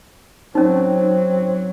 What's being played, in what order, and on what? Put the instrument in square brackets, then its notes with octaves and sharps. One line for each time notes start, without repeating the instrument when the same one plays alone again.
[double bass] F#3 [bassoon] C4 [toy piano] C#4 D#4